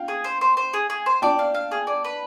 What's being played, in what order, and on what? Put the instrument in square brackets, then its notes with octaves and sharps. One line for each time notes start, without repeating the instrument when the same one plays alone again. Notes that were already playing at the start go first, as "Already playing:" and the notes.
Already playing: [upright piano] F5 G5
[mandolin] G#4
C5
C5
C5
G#4
G#4
C5
[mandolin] D5 [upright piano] G5 A5
[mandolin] F5
F5
G#4
D5
B4